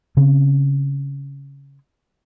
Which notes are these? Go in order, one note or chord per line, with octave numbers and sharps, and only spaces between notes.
C#3 C4 C#4